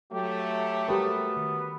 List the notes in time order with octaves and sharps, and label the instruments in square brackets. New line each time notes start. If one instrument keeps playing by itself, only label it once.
[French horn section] F#3 A3 [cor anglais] G4
[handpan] G3 G4 A#4 [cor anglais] B3
[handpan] D#3